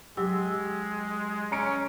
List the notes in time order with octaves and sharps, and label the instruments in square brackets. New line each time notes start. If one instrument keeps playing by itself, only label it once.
[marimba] F#3 E6 [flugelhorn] G#3 [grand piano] G4
[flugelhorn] C#4 [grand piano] A#5 C#7 D7